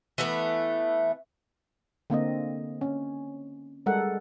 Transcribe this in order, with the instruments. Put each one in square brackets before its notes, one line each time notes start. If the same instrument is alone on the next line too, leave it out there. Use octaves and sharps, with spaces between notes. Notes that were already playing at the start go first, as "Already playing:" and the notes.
[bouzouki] E3 A3 B3
[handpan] D3 A#3 C4 D#5
C#4
G3 G#3 A4 A#4 F#5